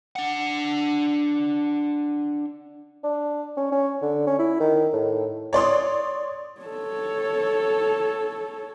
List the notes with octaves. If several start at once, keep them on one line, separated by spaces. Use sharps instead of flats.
D4 F#5
D4
C#4
C#4
D3
C#4
E4
D#3
A2
C#5 D5 C6 D#6
A4 C#5